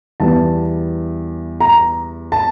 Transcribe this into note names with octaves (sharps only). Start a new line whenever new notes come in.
E2 E3 G3 A5
A#5
A5